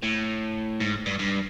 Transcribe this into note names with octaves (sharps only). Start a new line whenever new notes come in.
A2
G#2
G2
G2